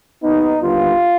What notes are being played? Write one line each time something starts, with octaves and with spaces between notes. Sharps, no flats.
D#2 D#3 B3 D#4
D#2 D3 G3 B3 F4